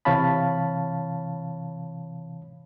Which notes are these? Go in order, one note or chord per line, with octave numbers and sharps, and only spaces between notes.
C3 E3 C#5 F5 A5 B5